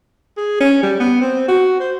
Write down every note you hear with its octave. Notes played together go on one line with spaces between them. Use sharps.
G#4
C#4
G3
B3
C4
F#4
C5